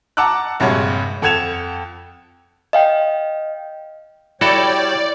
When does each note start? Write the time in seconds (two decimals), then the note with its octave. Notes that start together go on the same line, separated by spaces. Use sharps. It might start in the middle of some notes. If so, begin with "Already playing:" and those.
0.17 F#5 A5 A#5 D6 E6 F#6
0.60 A#1 G2 C3 G#3 C#5 F#5
1.22 F2 A4 F#5 G#6 E7 F7
2.73 D#5 F5 G5
4.41 G3 E4 F#4 A4 C#5 D5 G5